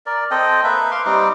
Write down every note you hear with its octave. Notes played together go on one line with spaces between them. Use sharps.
A#4 D5
C4 A4 D#5 G5
A#3 B4 E5
F5 C6 D6
G3 C4 D#4 D6